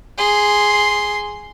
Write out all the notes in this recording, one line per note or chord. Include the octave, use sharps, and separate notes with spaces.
G#4 C6